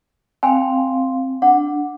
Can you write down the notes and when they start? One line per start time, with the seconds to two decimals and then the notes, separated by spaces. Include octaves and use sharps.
0.43 C4 F5 G5 G#5
1.42 D4 F#5